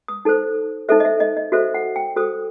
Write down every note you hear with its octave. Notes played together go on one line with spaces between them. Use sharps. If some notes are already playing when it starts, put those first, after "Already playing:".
D#6
D#4 A4 C5
D#4 A4 C5 E5
D#5
E5
D#5
D#5
F#4 A4 C5 E5
F#5
G5
F#4 A4 C5 D#6